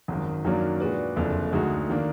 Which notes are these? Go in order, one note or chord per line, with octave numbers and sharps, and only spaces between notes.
G#1 F#2 D#3
F#2 D#3 F#3 A#3 D4
A#2 G#3 D4 F#4 B4
F#1 F2 D3
D2 D3 G#3 D#4 F#4
D#3 A#3 D4